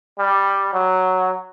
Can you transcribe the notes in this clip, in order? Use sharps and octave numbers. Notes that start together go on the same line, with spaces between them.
G3
F#3